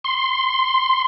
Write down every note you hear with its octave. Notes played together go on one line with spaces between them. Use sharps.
C6